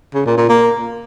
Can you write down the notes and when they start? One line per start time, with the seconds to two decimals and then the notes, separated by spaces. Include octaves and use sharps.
0.14 C#3
0.26 A#2
0.37 A#2
0.49 A#3